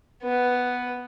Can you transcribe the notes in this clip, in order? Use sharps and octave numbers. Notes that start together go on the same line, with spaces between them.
B3